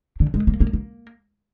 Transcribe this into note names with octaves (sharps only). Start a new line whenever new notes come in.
D3
G#3
A#3
A#3
A#3